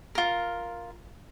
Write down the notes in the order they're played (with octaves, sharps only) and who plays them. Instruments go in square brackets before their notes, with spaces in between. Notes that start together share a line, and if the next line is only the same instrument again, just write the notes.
[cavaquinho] F4 A#4